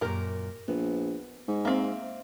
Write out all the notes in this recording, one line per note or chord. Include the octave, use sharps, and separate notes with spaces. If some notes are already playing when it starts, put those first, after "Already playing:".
F#2 A#2 G4 A#4
A#1 B3
G#2
A#3 C4 E5